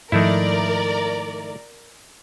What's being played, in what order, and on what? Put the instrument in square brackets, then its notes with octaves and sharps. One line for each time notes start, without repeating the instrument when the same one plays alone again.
[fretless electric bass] G#2 F3 [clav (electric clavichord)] D#3 A3 E4 [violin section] A#4 D5